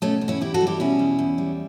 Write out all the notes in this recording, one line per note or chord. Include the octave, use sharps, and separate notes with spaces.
B2 A3 C#4
E2
C#4 E4
E2 E4 G4
F#4 A4
G3
E4 G4
B2 C#4 E4
E2
E2
G3